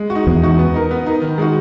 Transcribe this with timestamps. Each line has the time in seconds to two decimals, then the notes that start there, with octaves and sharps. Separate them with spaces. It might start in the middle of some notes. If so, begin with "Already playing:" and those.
Already playing: G#3
0.10 F#4
0.15 D#4
0.27 E2 G#3
0.42 D#4 F#4
0.59 B3
0.74 D#4 A#4
0.91 B3
1.06 D#4 A#4
1.22 D#3
1.38 G#3 D#4 F#4